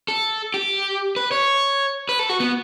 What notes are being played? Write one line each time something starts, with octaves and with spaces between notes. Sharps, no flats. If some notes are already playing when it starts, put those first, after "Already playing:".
A4
G4
B4
C#5
B4
A4
F#4
B3